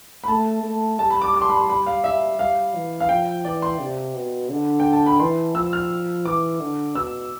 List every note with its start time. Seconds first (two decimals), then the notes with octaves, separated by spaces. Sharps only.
0.24 B5
0.28 A3 A5
0.64 A3
0.99 G3 A5
1.10 B5
1.22 D6
1.34 D6
1.41 C6
1.50 B5
1.57 C6
1.70 B5
1.86 F5
2.04 E5
2.39 G3 F5
2.75 E3
3.00 F5
3.09 F3 G5
3.45 E3 D5
3.62 C6
3.80 C3
4.15 B2
4.50 D3
4.80 G5
4.93 A5
5.06 B5
5.20 E3 C6
5.55 F3 E6
5.73 F6
6.25 E3 D6
6.60 D3
6.95 B2 E6